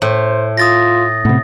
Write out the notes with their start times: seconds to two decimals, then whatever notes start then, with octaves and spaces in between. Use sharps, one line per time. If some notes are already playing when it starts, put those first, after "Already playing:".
0.02 A2 C5
0.57 F4 D#6 A6 A#6
1.25 A2 C3 B3